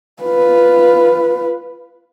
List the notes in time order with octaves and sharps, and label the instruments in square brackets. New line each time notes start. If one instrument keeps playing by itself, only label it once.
[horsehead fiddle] F4 B4